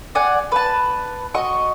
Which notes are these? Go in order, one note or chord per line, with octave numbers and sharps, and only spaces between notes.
D5 F#5 G#5
B4 A5
F#4 D#5 C#6